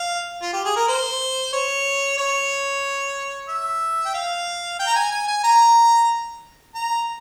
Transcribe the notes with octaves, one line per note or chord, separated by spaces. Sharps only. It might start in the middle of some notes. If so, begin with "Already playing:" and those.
Already playing: F5
F4
G4
G#4
A#4
C5
C#5
C#5
E5
G5
F5
G5
A#5
G#5
G#5
G#5
A#5
A#5